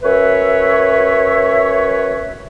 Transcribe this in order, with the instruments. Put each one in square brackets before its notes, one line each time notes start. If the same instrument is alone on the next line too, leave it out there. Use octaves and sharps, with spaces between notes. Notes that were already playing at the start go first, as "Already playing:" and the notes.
[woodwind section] F#2 B4 C#5 E5